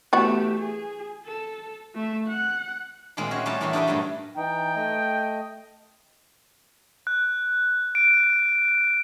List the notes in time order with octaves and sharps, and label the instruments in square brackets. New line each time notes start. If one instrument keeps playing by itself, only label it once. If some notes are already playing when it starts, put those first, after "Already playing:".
[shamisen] E3 B3 F#4 [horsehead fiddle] A3 G4
[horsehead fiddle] G#4
A4
A3 E5
F#5
[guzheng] A#2 D#3 G#3 A#3 C4
C#4 F#4 E5 G#5
G3 A3 C#4 D#4 F#4 A5
A2 E3 F#4 B4 E5 C6
D4 D#4 G4 A#4 D#5 E5
G2 A#2 F#3 A3
[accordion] E3 D#4 [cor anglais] G5
[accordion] A3 D#5
[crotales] F#6
D7